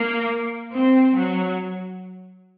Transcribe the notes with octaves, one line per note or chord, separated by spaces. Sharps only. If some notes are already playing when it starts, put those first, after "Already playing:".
Already playing: A#3
C4
F#3